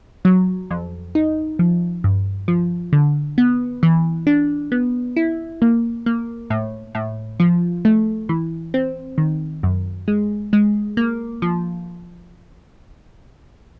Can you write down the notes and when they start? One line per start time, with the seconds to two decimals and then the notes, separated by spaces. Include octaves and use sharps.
0.25 F#3
0.71 F2
1.15 D#4
1.59 F3
2.04 G2
2.48 F3
2.93 D3
3.38 B3
3.83 E3
4.27 D4
4.72 B3
5.16 E4
5.62 A#3
6.06 A#3
6.50 A2
6.95 A2
7.40 F3
7.85 A3
8.29 E3
8.74 C4
9.18 D#3
9.63 F#2
10.08 G#3
10.53 G#3
10.97 A#3
11.42 F3